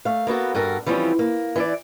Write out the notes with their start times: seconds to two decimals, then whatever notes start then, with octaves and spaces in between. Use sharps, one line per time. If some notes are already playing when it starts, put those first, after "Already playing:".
0.05 A3 F5
0.27 A#3 B3 F#4 A4
0.55 G2 F#4 A4 A#4
0.86 E3 F3 G3 C4 C#4
1.19 A#3
1.56 E3 A4 D5